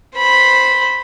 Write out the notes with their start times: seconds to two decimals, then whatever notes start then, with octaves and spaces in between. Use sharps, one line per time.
0.17 C5 B5